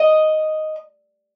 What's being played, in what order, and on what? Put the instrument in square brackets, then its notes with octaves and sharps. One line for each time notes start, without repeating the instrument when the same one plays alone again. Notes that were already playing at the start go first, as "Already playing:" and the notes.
Already playing: [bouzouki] D#5